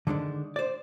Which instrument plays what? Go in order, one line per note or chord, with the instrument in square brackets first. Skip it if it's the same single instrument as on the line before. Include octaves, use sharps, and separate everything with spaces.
[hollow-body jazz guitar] D3 D#3 G#3 D4
C5 D5